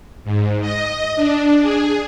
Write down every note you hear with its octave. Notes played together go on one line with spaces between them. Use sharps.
G#2
D#5
D4
G#4